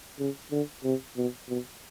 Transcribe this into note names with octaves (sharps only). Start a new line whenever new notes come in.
C#3
D3
C3
B2
B2